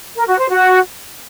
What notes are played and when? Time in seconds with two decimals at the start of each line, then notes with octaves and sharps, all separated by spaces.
0.15 A#4
0.27 F#4
0.38 C5
0.50 F#4